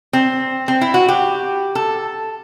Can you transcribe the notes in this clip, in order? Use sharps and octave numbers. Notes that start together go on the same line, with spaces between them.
C4
C4
E4
F#4
G4
A4